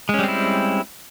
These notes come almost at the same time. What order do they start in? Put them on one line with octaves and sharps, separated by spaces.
G#3 C#4 G3 C4 E4